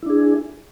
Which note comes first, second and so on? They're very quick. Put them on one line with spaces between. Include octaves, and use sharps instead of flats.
E4 D4 G#4